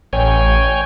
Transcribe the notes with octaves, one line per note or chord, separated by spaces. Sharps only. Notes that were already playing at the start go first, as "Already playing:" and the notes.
A1 C#5 G5 G#5